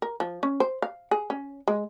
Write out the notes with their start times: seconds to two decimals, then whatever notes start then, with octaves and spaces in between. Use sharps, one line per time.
0.02 A#4
0.20 F3
0.43 C#4
0.60 C5
0.82 F5
1.11 G#4
1.30 C#4
1.68 G#3